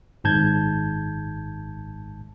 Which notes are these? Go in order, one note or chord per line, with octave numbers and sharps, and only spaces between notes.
G#1 G#2 A5 G6 G#6